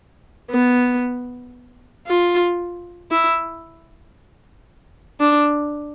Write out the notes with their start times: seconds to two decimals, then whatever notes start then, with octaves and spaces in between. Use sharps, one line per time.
0.50 B3
2.07 F4
3.11 E4
5.20 D4